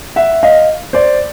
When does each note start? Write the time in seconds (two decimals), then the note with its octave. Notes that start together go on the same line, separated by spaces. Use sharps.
0.16 E5 F#5
0.43 D#5 F5
0.93 C5 D5